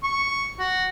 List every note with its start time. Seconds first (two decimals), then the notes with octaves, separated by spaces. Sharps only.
0.03 C#6
0.59 F#4